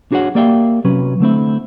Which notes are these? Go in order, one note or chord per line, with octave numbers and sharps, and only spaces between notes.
D4 F#4 G#4 C#5 F#5
A#3 G4 D5 E5 F5 G5
C3 F#3 C#4 B4
D3 A3 C4 E4